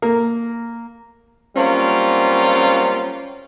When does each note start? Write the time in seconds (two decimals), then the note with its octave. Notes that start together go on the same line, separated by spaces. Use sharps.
0.02 A#3
1.57 F#3 G3 A#3 C4 C#4 F4